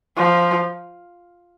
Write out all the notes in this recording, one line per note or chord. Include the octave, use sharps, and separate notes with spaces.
F3